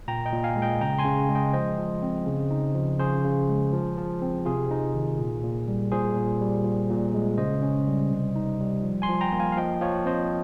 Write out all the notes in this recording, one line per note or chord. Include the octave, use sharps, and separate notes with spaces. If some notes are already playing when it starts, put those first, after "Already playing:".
A#2 G5 A#5
D#5 G5
A#2
F5 G#5
G#3
D#5 G5
C#3 G5 A#5
G#5 C6
C#3
G#3
D#5 G5
F3 C5 D#5
F3
C4
C#3
D#4
F3
C#3 G#4 C5
C#3
G#3
F3
F3
C4
C3 F4 G#4
D#4
D#3
A#2
A#2
G3
A#2 G#4 C5
A#2
G3
A#2
A#2
G#3
C#3 C5 D#5
C#4
G3
C3
D#4
G3
F3
G#5 C6
F3
G5 A#5
A#3
F5 G#5
F5
F3 D#5 G5
F3 C#5 F5
C4 C5 D#5